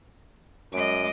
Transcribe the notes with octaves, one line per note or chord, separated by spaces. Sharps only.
F#2 G#3 D#5 D6